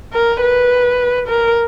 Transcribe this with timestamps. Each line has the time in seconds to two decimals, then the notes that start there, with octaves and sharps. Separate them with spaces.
0.14 A#4
0.42 B4
1.28 A#4